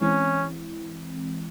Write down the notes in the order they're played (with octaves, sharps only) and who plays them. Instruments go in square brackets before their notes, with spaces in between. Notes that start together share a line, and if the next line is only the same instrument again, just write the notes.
[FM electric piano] E3 G#3 C4 E4 [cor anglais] C#4